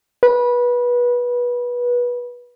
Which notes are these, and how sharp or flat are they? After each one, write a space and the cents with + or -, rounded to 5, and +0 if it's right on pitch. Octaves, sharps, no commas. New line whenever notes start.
B4 -20